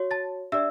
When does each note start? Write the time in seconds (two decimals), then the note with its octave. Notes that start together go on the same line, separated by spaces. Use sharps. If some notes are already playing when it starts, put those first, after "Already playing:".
Already playing: F#4 C#5
0.11 A5 A6
0.52 D4 G4 D5 E5 E6